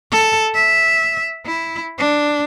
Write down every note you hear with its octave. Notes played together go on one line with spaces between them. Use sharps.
A4
E5
E4
D4